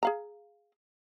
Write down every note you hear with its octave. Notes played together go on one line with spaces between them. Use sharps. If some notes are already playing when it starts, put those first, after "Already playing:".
G#4 F5 A#5